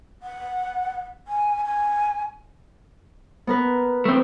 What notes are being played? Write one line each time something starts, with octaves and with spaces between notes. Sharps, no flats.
F#5
G#5
G#5
B3 A#4 B4
A3 C4